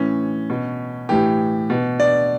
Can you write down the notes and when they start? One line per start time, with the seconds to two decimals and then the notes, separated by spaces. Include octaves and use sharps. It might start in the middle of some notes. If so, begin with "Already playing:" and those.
Already playing: A2 E3 C#4
0.50 B2
1.09 A2 E3 G4
1.70 B2
2.00 D5